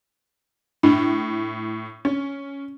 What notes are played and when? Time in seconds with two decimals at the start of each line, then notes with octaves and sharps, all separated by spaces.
0.83 A2 D4
2.05 C#4